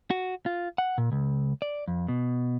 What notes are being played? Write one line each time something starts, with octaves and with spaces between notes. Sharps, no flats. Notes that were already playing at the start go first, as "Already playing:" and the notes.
F#4
F4
F#5
A#2
C#2
D5
F2
B2